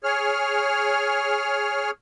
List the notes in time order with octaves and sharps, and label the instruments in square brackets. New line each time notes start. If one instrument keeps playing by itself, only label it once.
[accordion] G#4 C#5 F6